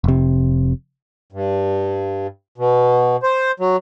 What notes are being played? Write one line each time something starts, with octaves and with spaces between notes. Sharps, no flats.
F1 C3
G2
B2
C5
F#3